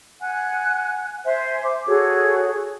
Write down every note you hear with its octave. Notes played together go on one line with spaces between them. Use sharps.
F#5 G#5 F#6
C5 E5 G#5
D6
F#4 G#4 A4 C#5